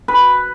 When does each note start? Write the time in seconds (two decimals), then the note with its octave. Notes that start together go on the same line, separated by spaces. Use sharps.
0.08 B4